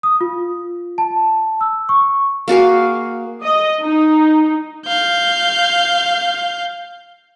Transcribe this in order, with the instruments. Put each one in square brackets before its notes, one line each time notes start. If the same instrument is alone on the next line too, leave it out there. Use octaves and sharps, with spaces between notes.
[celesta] D#6
F4
A5
E6
C#6
[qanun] A#3 F#4 G#4 F5
[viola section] D#5
D#4
[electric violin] F5 G6